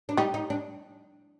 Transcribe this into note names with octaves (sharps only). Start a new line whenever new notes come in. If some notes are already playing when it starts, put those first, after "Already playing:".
D4
G3 D#4
D#4
D4